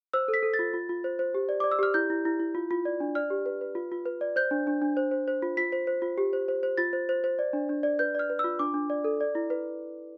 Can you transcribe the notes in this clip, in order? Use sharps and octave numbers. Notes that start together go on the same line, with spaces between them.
C5 E6
A4
B6
A4
A6
F4
F4
F4
C5
C5
G4
D5
D5 D6
E6
G4 F6
E4 G6
E4
E4
E4
F4
F4
D5
D4
D5 F6
G4
B4
B4
F4
F4
B4
D5
C5 G6
D4
D4
D4
C5
C5
C5
F4
F4 B6
C5
C5
F4
G4
C5
C5
C5
F4 A6
C5
C5
C5
D5
D4
D4
D5
B4 G6
D5 F6
B4
F4 E6
D4 D6
D4
D5
A4
D5
E4
B4